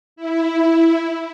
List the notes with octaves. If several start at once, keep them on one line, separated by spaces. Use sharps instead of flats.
E4